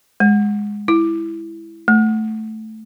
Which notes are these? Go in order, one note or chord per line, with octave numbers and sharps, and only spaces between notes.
G#3
E4
A3